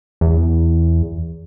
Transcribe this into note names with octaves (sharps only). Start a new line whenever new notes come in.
E2